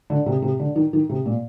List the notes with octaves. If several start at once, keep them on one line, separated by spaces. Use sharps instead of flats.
D3
C3
C3
D3
D#3
D#3
C3
A#2